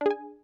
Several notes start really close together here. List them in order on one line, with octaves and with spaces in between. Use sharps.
D4 G#4 G#5